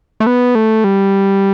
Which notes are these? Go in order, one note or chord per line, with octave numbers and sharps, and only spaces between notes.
A3
B3
A3
G3